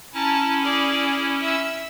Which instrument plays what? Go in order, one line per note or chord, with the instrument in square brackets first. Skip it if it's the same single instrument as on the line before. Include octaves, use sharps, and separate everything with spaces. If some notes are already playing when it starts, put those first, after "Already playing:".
[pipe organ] C#4 E4 [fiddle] A5 A#5
[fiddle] G#4 D5
E5 E6